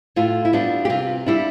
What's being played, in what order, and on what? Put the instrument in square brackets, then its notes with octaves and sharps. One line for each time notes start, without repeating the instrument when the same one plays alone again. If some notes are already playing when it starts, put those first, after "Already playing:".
[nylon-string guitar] A2 F4
E4
G3 B3 D4 F4
G4
C3 F4
G3 D4 E4